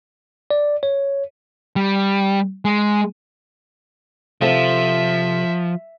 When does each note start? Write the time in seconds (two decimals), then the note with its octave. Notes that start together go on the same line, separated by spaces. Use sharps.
0.51 D5
0.83 C#5
1.76 G3
2.65 G#3
4.41 C3 F3 A4 E5 F5